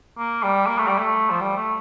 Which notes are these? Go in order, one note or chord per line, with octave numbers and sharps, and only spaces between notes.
A#3
G3
A#3
A3
G3
A3
F3
G3
A3